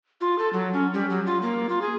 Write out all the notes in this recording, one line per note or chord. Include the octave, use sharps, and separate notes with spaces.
F4
A4
F#3
C#4
G3
F#3
F4
A#3
F4
G#4